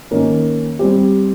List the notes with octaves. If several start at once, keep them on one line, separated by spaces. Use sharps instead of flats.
D#3 A#3 C#4
G3 C4 G4